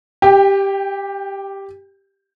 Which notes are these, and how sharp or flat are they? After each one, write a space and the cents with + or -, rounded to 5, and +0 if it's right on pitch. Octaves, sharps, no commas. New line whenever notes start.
G4 +0 G5 +35